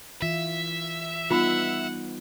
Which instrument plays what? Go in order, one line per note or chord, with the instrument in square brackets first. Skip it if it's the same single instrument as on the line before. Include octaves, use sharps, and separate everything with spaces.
[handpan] E3 F4 [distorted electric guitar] E5
[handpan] G3 B3 D#4 [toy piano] F4 B5 [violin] F#5